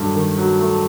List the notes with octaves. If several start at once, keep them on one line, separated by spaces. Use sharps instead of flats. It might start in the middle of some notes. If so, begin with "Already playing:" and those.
Already playing: G2 D#3 F#3 A3
D#3
F#3
A3